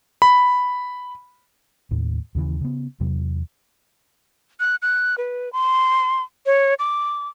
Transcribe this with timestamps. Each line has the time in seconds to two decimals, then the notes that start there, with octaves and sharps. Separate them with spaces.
0.22 B5
1.91 D#2 A2
2.35 D#2 C#3 E3
2.61 C#3 B3
3.00 E2 C3 F#3
4.60 F#6
4.82 F#6
5.18 B4
5.53 C6
6.46 C#5
6.79 D6